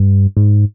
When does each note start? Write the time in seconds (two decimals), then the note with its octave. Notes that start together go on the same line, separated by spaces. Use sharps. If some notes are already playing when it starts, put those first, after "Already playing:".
Already playing: G2
0.37 G#2